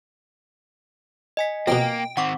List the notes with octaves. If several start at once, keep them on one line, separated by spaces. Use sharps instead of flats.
D#5 G#5 B6
F2 B2 A#3 G5
D#3 C4 F#5 C#6 D6